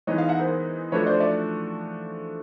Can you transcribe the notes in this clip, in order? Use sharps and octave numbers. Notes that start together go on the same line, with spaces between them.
E3 G#3 B3 D#4 C#5 D#5
D#5 F5
E5 F#5
A#4 C5
F3 A3 D4 F#4 B4 C#5
C5 D5
D5 E5